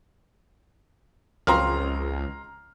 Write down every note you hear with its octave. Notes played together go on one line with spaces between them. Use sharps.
C#2 F#2 F3 C4 A#5 C6 F6